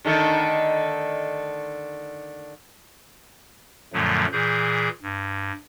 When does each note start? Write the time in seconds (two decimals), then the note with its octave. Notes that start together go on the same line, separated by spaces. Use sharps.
0.05 D3 D#3 A3
3.93 F#2 A#2 D3 F3 F#3 A3
4.32 A#2 E3 G#4 G6
5.03 G2